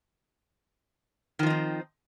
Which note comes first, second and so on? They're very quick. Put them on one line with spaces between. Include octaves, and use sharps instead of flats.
D#3 F3 D#4 C4